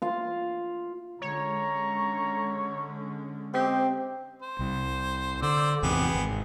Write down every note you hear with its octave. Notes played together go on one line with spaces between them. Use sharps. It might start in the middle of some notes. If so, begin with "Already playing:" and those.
F4 F5
D3 G#3 C#4 C#5 A#5
C4 G4 D#5
C5
C2
D3 C5 D5 E6
G#1 E2 C3 B3 G4 G#4
G#1